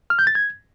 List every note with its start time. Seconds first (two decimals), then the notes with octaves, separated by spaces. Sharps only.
0.10 F6
0.19 G6
0.27 A6
0.35 G#6